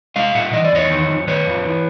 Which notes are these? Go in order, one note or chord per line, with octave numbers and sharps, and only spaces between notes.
G#3 D#5 F5
A#2 E5 F#5
E3 D#5
D5
E2 C#5 D#5
D#3
F2
D#3 B4 C#5
F2
E3